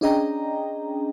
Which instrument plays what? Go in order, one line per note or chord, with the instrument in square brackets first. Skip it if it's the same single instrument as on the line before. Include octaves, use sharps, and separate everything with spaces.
[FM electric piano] C#4 D4 G#4 D#5 G5 A#5